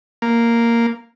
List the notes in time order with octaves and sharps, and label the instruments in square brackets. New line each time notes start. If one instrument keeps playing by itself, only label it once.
[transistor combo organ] A#3